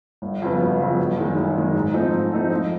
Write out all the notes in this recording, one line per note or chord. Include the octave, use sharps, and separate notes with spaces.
G1
F2 C#3 F#3 B3
G1
F2 C#3 F#3 B3
G1
F#2 D#3 G#3
G1
F#2 D#3 G#3
G#2
F3 A3 C4 D#4
G#2
F3 A3 C4 D#4
F2